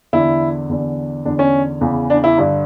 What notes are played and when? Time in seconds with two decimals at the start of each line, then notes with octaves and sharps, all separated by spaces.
0.13 E2 D3 E4
0.69 E2 D3
1.25 E2 D3 D4
1.39 C#4
1.81 E2 C#3 E3
2.10 D4
2.24 E4
2.38 G2 D3